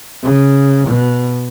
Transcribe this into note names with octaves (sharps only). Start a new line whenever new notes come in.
C#3
B2